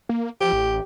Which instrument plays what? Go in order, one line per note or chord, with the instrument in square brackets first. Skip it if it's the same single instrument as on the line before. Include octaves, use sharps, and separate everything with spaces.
[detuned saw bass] A#3
[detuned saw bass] F3 [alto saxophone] G4
[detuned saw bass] A1